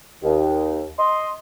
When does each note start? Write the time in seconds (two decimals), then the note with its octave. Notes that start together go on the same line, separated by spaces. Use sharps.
0.23 D#2
0.99 D#5 C6